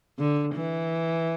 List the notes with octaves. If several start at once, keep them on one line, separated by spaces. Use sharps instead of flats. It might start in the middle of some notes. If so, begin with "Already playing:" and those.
D3
E3